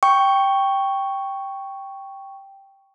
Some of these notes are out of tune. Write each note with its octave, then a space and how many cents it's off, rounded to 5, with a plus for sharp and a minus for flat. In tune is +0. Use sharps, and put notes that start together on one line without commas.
G5 +0 C#6 +0